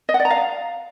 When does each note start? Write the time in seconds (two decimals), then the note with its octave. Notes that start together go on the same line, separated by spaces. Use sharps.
0.09 D#5
0.14 F#5
0.20 D5
0.25 A#5
0.30 F5